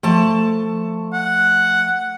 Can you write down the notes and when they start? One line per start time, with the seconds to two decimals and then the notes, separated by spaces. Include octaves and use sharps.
0.03 F3 A3 A5
1.13 F#5